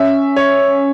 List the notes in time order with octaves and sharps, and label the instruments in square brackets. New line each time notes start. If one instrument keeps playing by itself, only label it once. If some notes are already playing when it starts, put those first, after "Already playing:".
Already playing: [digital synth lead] C#4 [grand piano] E5
[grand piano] C#5